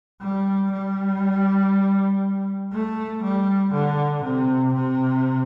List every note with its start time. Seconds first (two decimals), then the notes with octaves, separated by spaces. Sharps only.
0.21 G3
0.71 G3
2.72 A3
3.23 G3
3.73 D3
4.23 C3
4.74 C3